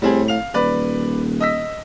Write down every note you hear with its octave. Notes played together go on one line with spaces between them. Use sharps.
A2 G3 C4 G#4
F5 F7
D#1 B4 D5
D#5 E6 B6